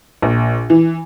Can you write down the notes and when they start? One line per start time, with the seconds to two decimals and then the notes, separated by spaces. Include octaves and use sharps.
0.22 A#1
0.70 E3